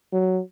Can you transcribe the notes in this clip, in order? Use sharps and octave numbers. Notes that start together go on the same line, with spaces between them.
F#3